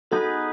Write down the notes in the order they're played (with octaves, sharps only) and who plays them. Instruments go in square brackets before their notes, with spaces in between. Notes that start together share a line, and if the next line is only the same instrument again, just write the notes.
[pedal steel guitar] B3 D#4 G#4 B4 [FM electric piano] F#4 A4